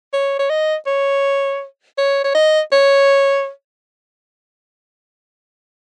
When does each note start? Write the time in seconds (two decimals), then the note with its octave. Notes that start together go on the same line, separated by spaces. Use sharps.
0.13 C#5
0.39 C#5
0.50 D#5
0.87 C#5
1.98 C#5
2.24 C#5
2.35 D#5
2.72 C#5